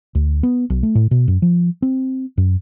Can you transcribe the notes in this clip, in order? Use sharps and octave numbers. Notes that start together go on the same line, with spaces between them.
D2
B3
B1
A3
A2
B2
F#2
F3
C4
F#2